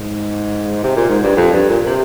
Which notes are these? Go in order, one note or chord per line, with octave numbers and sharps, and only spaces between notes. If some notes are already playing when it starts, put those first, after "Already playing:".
Already playing: G#2
C3
A#2
G#2
G2
F2
G2
A#2
C3